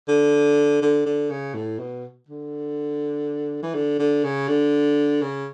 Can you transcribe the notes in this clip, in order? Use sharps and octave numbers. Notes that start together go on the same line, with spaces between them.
D3
D3
D3
C#3
A2
B2
D3
E3
D3
D3
C#3
D3
C#3